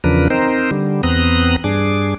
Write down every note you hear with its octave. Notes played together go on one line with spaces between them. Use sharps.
E2 C#3 F3 D4 A#4 B4
C4 D#4 A#4 C5
D3 G3
E2 B3 C4 A#5 D#6 F#6
G2 D4 G#4 D6